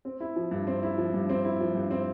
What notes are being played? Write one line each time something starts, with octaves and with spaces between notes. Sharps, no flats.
C4
E4
F3
G2
C4
E4
F3
G2
C4
E4
F3
G2
C4